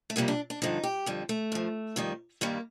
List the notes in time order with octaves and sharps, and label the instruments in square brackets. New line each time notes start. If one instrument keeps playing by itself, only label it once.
[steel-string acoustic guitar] A3
F2 C3 G3 A#3
D4
D4
G2 D3 F3 D#4
G4
F2 D3 G3
A3
G2 F3
F2 D#3 G3
G2 D#3 G3 A#3